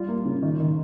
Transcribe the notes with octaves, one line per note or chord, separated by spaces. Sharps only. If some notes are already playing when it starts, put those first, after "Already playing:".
Already playing: G3 F4
A#3
C#3
D#3
D#3